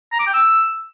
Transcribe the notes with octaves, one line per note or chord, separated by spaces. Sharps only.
A#5
D6
G5
E6